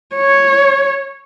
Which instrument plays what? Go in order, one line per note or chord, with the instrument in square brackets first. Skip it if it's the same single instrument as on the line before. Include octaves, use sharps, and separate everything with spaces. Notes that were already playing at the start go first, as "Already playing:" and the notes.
[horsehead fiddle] C#5